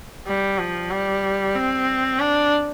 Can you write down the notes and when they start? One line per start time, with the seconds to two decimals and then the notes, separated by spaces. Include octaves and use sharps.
0.27 G3
0.59 F3
0.91 G3
1.55 C4
2.19 D4